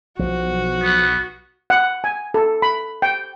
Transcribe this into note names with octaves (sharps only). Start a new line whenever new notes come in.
B1 F3 F#4
B3
F#5
G#5
A4
B5
G5